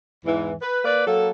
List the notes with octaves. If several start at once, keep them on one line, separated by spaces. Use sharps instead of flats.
E2 G#2 E3
B4
A#3 B4 D5
F#3 A#3 A4